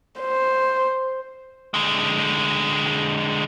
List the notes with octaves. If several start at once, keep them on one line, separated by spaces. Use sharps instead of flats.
C5
D3 G#3